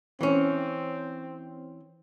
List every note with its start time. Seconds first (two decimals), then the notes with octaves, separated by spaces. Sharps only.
0.21 E3 C4 C#4